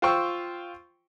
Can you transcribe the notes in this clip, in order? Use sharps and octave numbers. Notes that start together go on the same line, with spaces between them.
F4 C5 G5 C#6 E6